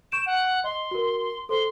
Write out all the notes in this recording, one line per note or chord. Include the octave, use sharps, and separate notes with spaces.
C#6 G6 D7 E7
F#5
D#5 C6
F#4 A#4
A4 C5 C6